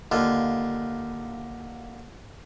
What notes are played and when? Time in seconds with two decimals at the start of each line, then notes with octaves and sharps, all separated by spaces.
0.12 D#2 D3 F4